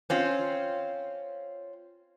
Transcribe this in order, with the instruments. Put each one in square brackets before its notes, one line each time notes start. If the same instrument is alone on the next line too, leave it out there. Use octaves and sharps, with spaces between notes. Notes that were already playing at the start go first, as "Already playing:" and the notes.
[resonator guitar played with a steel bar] C4 C#4 F4